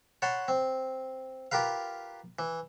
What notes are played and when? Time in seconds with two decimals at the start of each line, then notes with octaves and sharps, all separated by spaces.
0.22 C#5 F#5 A5 B5 C6
0.48 C4
1.52 F4 G4 A#4 B4 F5
2.39 E3